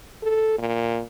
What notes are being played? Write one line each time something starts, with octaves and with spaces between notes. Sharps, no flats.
A4
A#2